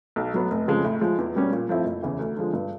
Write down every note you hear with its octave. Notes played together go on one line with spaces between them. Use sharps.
B1
A2 F#3 B3
F1
F2 C#3 F3 G#3
A2
F3 G#3
E2
B2 G3 A#3 C#4
A#2
F3 A3 C4 E4
F#1
E2 C#3 E3
D2
D3 F3 G#3
G2